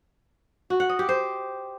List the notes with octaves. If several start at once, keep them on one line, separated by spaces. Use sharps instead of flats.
F#4
F#5
D#5
G4
C5